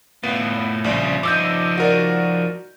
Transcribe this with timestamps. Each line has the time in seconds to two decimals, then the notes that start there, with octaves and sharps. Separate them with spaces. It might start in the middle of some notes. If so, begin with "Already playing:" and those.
0.23 A2 B3 F4
0.84 A#1 C#3 G3
1.23 F3 D#4 D6 E6 G6
1.77 F#4 A#4 D5